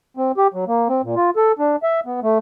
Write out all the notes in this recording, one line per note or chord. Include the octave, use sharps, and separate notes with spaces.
C4
G4
F#3
A#3
C4
A#2
F4
A4
D4
E5
B3
A3